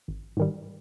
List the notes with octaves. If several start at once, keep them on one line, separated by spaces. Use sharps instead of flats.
G#1
G#2 D#3 G3